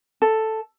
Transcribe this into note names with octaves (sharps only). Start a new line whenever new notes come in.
A4